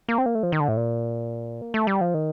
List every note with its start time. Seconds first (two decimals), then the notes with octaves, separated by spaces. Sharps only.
0.08 A#3
0.18 C4
0.26 A#3
0.35 A3
0.43 F3
0.52 D#3
0.60 D3
0.68 A2
0.77 A#2
1.62 A#3
1.74 A3
1.87 G3
2.01 F3
2.14 D#3